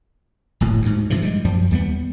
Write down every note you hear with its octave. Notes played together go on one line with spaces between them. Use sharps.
D1 G#1 A2
D2 G#2
G2 C3 E3 F3
G3 G#3
F#2 F3 G3
D#2 G3 A#3 B3